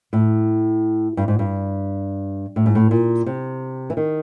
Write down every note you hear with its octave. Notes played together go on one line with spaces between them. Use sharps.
A2
G2
G#2
G2
A2
G#2
A2
A#2
C3
E3
D#3